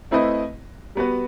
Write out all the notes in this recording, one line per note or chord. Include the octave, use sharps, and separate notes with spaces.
A3 C4 E4 B4 D#5
G3 B3 F#4 B4